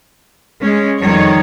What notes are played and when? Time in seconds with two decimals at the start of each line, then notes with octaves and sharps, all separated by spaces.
0.62 G#3 C#4
1.00 F2 D#3 G3 C#5